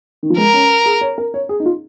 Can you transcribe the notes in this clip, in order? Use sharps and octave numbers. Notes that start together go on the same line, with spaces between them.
D#3
F3
G#3 A#4
C#4
G#4
C#5
A#4
C#5
G#4
D#4
F4